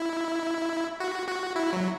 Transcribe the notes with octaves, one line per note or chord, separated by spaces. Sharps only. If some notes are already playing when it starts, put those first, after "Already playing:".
Already playing: E4
F#4
F#4
E4
F#3